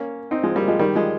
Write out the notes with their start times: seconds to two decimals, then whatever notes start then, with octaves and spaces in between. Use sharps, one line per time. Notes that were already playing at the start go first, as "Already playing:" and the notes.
Already playing: A#3 C#4
0.31 C4 D#4
0.43 F3 G#3
0.56 G3 A#3
0.68 F3 G#3
0.80 D#3 G3
0.95 F3 G#3